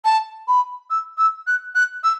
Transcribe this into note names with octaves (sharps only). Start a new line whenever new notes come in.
A5
B5
E6
E6
F#6
F#6
E6